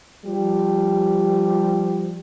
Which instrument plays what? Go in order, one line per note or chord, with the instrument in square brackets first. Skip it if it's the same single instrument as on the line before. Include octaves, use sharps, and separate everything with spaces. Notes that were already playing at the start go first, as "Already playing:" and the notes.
[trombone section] F3 G3 G4